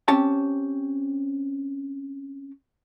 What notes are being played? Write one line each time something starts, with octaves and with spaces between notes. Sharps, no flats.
C4 C#4 G4 A5